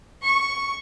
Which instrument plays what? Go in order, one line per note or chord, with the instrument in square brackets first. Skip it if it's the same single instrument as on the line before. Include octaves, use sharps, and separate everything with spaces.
[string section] C#6